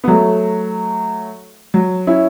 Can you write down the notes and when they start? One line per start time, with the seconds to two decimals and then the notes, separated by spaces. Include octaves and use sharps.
0.04 B3
0.08 F#3 A3
1.74 F#3
2.07 C#4 E4